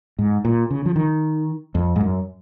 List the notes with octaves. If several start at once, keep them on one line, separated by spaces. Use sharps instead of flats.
G#2
A#2
C#3
F3
D#3
F2
G#2
F#2